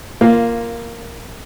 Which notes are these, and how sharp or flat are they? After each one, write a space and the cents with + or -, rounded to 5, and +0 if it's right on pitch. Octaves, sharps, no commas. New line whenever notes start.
A#3 +0 F4 -15